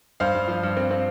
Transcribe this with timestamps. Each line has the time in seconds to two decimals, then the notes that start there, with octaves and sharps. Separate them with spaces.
0.20 G2 C5 F5
0.34 G2
0.48 F3
0.63 G2
0.77 C4
0.91 C4